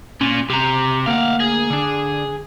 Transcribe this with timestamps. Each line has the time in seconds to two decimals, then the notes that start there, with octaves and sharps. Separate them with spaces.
0.21 A#2 C#4
0.50 C3 G4 A#5
1.06 D2 A#3 F5 F#5
1.40 G#4
1.70 D3 D4